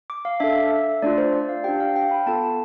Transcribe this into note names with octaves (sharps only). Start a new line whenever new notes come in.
D6
F5
D4 A4 E5
E5
A3 D4 F4 D5
C5
D5
F5
D4 G4 G5
F5
G5
B5
B3 F4 A4 A5